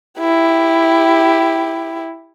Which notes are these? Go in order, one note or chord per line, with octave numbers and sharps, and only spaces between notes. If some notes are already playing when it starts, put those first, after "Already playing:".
E4 G4